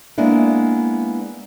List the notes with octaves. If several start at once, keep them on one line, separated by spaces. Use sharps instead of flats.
G#3 A#3 B3 D4 E4